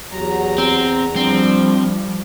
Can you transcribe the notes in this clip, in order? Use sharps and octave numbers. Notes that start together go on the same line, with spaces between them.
E2 F#3 G4 A#5
C4
F3 G3 C4 D4